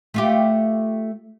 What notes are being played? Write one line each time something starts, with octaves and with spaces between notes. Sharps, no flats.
A3 F4 G4